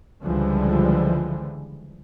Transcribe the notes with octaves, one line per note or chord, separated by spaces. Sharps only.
C#2 D3 E3 F3 G3 G#3